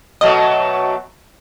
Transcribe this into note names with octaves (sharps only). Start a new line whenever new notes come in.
B2 F#3 A3 D#5